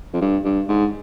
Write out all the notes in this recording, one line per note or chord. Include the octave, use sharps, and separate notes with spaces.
F2
G2
G2
G#2